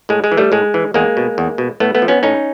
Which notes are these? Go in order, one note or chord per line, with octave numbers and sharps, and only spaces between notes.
A2 G#3
G#3
E3
G3 A3
A2 G#3
E3
E2 G#3 A#3
B2
E2
B2
A2 A3 B3
A3 B3
F3
B3 C#4
A2 C#4 D#4